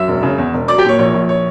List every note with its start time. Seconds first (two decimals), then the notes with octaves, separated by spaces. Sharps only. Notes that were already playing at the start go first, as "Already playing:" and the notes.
Already playing: F#2 E5 E6
0.08 E1
0.23 C#3
0.38 E2
0.53 E1
0.68 F#3 D5 D6
0.78 G4 G5
0.84 A#2 C#5
0.99 A#1 C#5
1.14 A#1
1.29 C#5